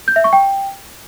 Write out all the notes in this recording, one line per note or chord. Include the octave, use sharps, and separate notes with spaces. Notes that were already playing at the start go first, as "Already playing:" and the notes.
G6
E5
C#6
G5